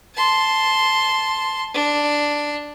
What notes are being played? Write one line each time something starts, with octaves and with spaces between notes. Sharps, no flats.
A5 C6
D4